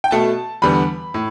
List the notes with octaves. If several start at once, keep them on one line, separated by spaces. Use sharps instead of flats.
G5
B2 A3 A5
E2 D3 G3 B3 B5
A2